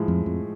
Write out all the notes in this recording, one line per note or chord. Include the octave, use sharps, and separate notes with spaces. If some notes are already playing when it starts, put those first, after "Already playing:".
Already playing: A2 F3 G#3
F2
F2